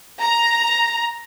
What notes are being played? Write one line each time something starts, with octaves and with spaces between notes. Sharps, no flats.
A#5